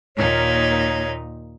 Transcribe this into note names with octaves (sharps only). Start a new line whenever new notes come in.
D#2 A#2 D#4 C#5